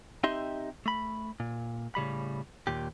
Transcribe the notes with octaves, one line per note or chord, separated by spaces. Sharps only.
C4 D#4 G4 D#5 E5 C6
A3 B5
A#2
A2 C#3 G3 B5
D#2 A#2 G4